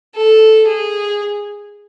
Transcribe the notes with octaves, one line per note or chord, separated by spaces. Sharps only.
A4
G#4